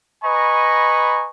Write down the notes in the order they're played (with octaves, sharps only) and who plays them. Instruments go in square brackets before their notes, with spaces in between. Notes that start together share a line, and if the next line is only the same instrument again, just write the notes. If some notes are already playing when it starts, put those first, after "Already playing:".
[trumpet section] B4 D#5 G#5 A#5 B5 C#6